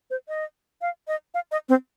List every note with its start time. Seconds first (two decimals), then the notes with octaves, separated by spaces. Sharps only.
0.10 C5
0.28 D#5
0.82 F5
1.08 D#5
1.34 F5
1.52 D#5
1.69 C4